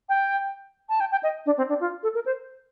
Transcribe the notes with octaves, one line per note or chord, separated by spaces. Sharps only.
G5
A5
G5
G5
D#5
D4
C4
D4
F4
A4
A#4
C5